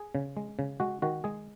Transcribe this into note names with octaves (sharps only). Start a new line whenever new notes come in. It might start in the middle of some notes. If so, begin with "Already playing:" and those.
Already playing: G#4
C#3
G#3
C#3
G#3 F#4
D#3 F#4
G#3 G#4